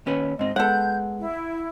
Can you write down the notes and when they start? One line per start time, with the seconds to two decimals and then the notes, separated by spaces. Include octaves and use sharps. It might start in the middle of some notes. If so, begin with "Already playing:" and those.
0.06 D#2 C#4 B4
0.39 G#2 C4 D#5
0.56 G#3 B3 A4 F#5 G6
1.19 E4